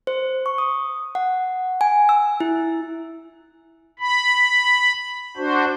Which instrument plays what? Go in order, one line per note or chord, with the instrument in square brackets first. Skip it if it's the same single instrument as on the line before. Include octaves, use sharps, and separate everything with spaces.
[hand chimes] C5
C#6
D#6
F#5
G#5
E6
E4
[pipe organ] B5
D4 F#4 C5